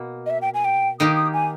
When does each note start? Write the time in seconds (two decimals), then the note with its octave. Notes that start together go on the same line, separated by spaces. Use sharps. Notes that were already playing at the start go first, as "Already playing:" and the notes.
Already playing: B2 A#3
0.26 D#5
0.30 E5
0.42 G5
0.54 G#5
0.65 G5
1.00 D#3 A#3 D#4 G4 D#6
1.16 D#6
1.34 G#5